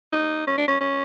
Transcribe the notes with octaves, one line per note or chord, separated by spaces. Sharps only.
D#4
C#4
D4
C#4
C#4